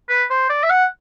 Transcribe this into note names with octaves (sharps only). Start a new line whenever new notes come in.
B4
C5
D5
E5
F#5